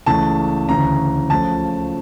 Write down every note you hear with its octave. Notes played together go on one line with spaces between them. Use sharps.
C#2 C#3 E3 A3 A5
D2 C#3 E3 A#5
C#2 C#3 F3 A3 A5